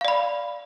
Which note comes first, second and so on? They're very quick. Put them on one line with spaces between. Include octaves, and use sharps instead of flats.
F5 D5 B5